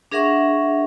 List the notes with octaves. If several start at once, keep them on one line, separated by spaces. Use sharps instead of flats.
D4 G#4 A#4 E5 F#5 C#6